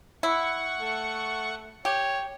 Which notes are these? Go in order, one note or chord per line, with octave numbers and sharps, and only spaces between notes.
E4 F#5 C#6
A3
G4 C#5